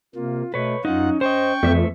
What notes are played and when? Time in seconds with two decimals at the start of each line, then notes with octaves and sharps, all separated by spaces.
0.15 C3 A#3 F4
0.54 B2 A3 B4 C#5
0.85 F#2 C#4 D#4 F4 F#5
1.21 C5 D#5 G5 C#6
1.63 F2 E3 A3 E5